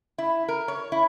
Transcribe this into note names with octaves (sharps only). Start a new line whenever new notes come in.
E4
A#4
C#5
E4